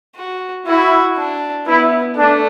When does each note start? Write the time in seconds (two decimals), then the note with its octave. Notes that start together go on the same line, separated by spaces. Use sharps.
0.16 F#4
0.66 E4 F#4
1.17 D4
1.66 B3 E4
2.17 A3 D4